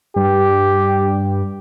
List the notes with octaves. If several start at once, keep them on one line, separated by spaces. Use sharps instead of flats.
G2 G4